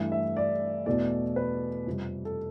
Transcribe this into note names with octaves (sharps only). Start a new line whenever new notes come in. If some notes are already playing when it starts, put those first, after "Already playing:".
Already playing: G2 E3 A3
E5
D5
E2 B2 A3 D5
B4
F2 C3 G3
A4